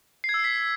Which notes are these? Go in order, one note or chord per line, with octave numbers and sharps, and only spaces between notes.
C7
G#6
E6
C7
B6